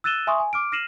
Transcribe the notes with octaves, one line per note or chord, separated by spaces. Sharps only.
E6 F#6 A6 D#7 E7 G7
E5 G#5 C6 C#6 D#6
G#5
D6 F6 D7
F6 A#6 C7 D#7 E7 F#7